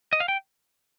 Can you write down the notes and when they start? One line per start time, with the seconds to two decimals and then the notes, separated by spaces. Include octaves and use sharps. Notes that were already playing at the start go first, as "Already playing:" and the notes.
0.13 D#5
0.20 F5
0.28 G5